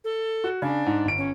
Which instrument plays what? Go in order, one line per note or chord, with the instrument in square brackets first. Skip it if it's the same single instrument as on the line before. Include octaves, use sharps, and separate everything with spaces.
[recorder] A4
[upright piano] F#4
[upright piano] C#3 [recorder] D4
[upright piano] G#2
G1 D7
[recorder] C#4